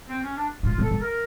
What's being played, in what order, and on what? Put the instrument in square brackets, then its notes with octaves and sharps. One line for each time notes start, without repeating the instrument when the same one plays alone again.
[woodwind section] C4
C#4
D4
[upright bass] G#2 [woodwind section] F4
[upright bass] A2
[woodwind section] A4
[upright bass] G#2
[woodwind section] A#4